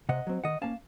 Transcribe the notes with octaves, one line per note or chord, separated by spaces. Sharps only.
C3 D#5 F#5
F#3 C4
D#3 D#5 F#5
A#3 C#4 F5 A5